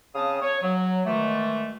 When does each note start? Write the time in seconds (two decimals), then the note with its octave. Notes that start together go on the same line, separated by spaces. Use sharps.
0.15 C#3 C4 F5 A5 D#6
0.42 C#5
0.62 F#3
1.06 B2 D#3 E3 G#3 A3